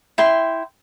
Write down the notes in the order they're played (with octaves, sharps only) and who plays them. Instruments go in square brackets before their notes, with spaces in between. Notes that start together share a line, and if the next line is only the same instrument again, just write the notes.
[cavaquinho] E4 G5 C6